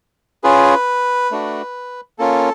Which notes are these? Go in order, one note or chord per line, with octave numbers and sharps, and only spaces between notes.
C#4 F4 G#4 B4
A3 D4 F#4
A#3 C#4 F4 A4